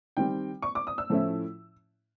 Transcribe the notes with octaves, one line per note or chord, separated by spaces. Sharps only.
D#3 G3 C4 G5
C#6
D6
D#6
E6
A2 F3 A3 C#4 E4